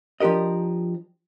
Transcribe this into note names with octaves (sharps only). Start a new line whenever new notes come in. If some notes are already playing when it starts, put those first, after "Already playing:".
F3 D4 G4 A#4 D#5